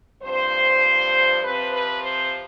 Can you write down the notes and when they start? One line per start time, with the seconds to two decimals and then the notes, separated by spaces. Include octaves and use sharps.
0.22 G2 F3 C4 C5
1.42 C3 F3 C4 B4
1.72 B4
2.02 C5